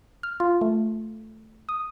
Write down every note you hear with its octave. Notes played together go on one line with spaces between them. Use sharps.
F6
F4
A3
D#6